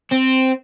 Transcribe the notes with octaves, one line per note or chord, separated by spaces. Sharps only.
C4